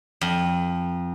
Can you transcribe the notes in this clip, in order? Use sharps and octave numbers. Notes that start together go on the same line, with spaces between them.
F2